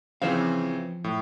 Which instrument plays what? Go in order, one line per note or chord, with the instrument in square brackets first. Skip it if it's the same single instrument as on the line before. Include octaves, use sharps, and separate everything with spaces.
[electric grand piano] C#3 E3 C4 [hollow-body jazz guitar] F3 C5 F5
[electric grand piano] A2